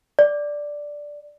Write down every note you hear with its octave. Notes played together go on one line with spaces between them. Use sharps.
D5